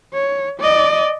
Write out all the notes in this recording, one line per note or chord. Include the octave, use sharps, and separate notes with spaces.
C#5
D5 D#5